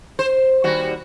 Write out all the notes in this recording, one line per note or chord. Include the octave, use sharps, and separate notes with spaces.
C5
D#2 G3 F#4